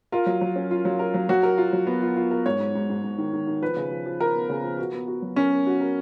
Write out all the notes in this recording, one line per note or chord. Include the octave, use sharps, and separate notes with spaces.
F4 A#4
F#3
F#3
C#4
F4
F#3
A#4
F#3
F#3 F#4
A#4
F4
F#3
B3
F4
F4
A#4
G#2 C#5
G#2
G#2
G#2
G#2
D#3
D#3
D#3
F3 B4
C#3
F3
F3
F4 A#4
B3
C#3
F3
F#4
B3
F#4
F#3
C#4 A#4
A#4
F#4
A#4